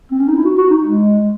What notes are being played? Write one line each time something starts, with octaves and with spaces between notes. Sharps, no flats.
C4
C#4
D#4
E4
F#4
F#4
D#4
G#3